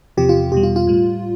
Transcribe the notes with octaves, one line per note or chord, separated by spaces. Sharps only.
E2 C3 F3 G4
F4
E2 B2 G3 G4
F4
F4
A2 G3